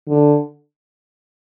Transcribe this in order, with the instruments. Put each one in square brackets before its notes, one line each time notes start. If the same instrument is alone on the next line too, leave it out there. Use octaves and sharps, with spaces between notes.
[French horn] D3